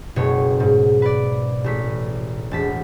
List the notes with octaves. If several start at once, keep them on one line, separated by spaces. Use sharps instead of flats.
F#1 B2 A3 C#5
G#2
B4 D5
A1 A3 B6
E1 A5 B6